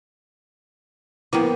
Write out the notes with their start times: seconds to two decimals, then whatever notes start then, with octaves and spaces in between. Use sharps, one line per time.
1.33 F3 A#3 B3 E4 G5